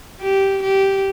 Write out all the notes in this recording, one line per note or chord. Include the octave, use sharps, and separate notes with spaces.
G4
G4